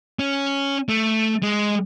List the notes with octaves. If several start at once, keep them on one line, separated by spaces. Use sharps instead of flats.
C#4
A3
G#3